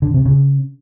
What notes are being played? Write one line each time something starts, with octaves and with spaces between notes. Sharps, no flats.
D3
C3
C#3